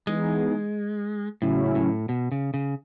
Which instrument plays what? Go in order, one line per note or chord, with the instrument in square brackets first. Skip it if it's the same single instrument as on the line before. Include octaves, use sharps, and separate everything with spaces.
[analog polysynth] E3 B3 D#4 G#4 [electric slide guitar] G#3
[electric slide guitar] A2 [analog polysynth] C#3 F#3 C#4 E4
[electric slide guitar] A2
B2
C#3
C#3